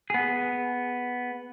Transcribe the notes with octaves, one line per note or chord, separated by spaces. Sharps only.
B3 G#4